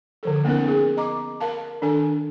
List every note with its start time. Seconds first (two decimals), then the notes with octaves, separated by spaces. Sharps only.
0.23 D3 F3 A4
0.45 A#3 B3 C#4 D#4 A#4
0.65 B3 G#4
0.97 D#5 A#5 D6
1.40 A#4 F5 A5
1.82 D#3 D4 A4 G#5